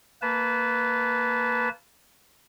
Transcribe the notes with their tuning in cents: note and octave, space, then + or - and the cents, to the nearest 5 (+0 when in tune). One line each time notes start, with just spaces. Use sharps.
A#3 -15 B4 +0 A5 -25